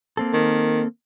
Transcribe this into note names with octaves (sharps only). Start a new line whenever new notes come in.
A#3 C4 A4
D#3